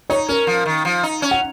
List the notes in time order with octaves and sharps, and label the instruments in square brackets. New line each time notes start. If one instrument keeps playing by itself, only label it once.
[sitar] D#4 [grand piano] C#5
[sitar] C#4 [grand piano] A#4
[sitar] F3
D#3
F3
D#4
C#4
[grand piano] F#5